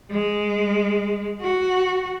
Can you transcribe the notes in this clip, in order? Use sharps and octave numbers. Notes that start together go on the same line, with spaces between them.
G#3
F#4